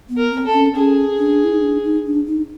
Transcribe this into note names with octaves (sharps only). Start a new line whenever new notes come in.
B3
A#4
C4
A4
C#4
C#4 G#4
D4
E4
D#4
D4
D#4
D4
D#4